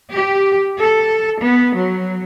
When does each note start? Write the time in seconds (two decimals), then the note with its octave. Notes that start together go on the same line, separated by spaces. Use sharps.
0.15 G4
0.79 A4
1.39 B3
1.77 F#3